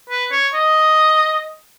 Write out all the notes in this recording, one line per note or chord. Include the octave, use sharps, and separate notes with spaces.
B4
C#5
D#5